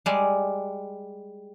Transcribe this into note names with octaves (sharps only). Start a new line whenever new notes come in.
G3 G#3 G#5